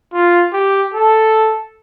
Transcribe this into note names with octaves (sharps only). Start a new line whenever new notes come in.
F4
G4
A4